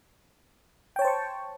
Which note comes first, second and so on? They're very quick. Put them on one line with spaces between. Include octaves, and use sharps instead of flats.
G5 C#5 A5 C5 C#6